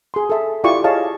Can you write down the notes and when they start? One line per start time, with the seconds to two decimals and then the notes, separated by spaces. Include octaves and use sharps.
0.14 G#4 C6
0.30 A4 E5
0.64 E4 F4 G4 D5 C#6
0.84 G#4 C#5 D#5 F5 A5